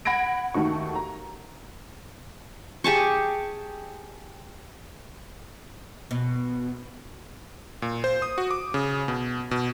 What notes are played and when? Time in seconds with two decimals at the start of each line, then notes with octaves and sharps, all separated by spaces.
0.05 F#5 B5 G#6 A#6 D7
0.54 D#2 D#3 A3 F#4 C#6
0.96 A#5
2.84 G4 G#4 A5 C#6
6.11 B2
7.82 A#2
8.04 C5
8.22 D#6
8.38 F#4
8.51 D6
8.74 C#3
9.08 B2
9.51 B2